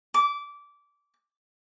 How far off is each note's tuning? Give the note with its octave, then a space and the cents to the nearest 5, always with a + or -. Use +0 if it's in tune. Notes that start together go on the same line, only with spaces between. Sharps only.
D6 -20